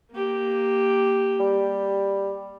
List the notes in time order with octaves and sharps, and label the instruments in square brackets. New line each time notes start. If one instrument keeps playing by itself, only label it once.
[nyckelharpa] A#3 G4
[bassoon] G3